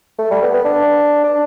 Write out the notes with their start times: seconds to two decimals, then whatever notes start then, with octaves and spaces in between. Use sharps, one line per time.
0.18 A3
0.31 G3
0.42 B3
0.54 B3
0.65 D4
1.24 D4